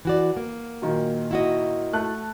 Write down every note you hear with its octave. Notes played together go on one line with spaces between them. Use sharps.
E3 F#4 D5
A#3
A#2 D#3 F#3
E4 F#4 D#5
A3 A5 F#6